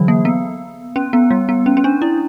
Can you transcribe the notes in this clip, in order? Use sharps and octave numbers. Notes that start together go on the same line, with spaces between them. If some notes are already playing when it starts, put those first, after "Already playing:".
Already playing: D3 E3 F#3
A#3
B3
C#4
B3
G3
B3
C#4
C#4
D4
E4